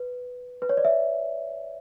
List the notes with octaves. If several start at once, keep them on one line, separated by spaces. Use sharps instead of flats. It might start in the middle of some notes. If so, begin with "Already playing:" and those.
Already playing: B4
B4
C#5
D5
E5